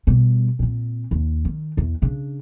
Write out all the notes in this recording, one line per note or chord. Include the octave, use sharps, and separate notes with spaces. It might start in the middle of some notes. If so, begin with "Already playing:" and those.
B2 G3
A#2 C4
D#2
D#3
E2
C#3 D4